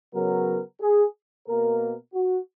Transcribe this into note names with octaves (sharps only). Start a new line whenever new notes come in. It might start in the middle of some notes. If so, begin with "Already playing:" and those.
C#3 F#3 B3 A#4
G#4
B2 A#3 A#4
F#4